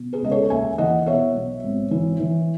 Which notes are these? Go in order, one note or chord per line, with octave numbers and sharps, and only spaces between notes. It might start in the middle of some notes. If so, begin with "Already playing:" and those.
Already playing: B2
G#4 B4
C#2 D#5
A4 C#5
D#2 E5 G#5
E3 D#5 F#5
B2 C#5 E5
B1
G#1
E3
E3